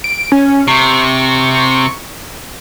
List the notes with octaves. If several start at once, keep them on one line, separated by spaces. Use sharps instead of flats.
D7
C#4
C3 C#6